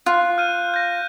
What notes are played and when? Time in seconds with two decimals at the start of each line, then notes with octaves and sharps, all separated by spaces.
0.06 F4 F#6
0.38 F6 G6 D#7
0.74 G6 A#6